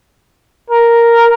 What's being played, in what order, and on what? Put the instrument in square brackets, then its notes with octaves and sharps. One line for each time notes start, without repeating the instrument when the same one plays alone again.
[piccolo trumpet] A#4